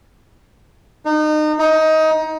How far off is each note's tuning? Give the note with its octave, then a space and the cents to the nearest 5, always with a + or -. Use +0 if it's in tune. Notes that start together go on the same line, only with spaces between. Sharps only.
D#4 -30
D#4 +20